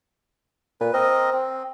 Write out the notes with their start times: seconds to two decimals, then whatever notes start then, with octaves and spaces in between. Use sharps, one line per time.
0.81 A#2 B4
0.93 C4 A#4 C5 D#5
1.32 C4